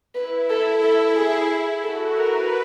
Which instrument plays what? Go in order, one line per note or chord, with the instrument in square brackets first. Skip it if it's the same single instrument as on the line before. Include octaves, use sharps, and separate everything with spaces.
[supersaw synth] E4 [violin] B4
[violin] A4
A4
G#4
[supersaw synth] F#4 [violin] A4
[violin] A#4 [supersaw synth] B4